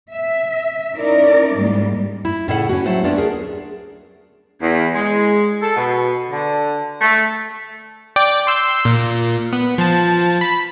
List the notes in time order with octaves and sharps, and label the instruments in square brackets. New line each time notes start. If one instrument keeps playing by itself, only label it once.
[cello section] E5
C#4 D#4 E4 A#4 D5
G#2 G3 G#3 A#3
[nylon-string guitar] E4
A2 C#3 E4 A4 E5 F#5
C#4 F#4
F#3 A3 C5 F#5
A3 B3 C#4 D4 F4
D2 G#4 A#4
[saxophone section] E2
G#3
A4
B2
D3
A3
[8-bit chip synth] D5 G5 D6
C6 E6 G6
A#2
B3
F3 A5
B5